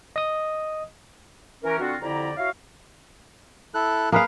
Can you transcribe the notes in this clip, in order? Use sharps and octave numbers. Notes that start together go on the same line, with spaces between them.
D#5 D#6
E3 C#4 A#4
D3 C4 D4 F4 F#4
F2 D3 E4 G4 D5 A#5
E4 F#4 C#5 F5
E4 A4 F#6
A#3 G#4 B4 F5